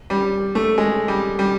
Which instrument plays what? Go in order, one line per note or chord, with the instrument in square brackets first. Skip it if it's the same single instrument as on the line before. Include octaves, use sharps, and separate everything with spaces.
[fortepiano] G3
A3
G#3
G3
G3